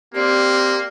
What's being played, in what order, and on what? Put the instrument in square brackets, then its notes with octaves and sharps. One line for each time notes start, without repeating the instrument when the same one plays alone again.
[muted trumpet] A#3 [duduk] C4 [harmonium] G4 [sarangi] D5